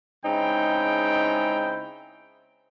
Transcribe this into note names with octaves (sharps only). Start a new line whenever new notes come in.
C#3 G#3 C4 D#4 E4 G5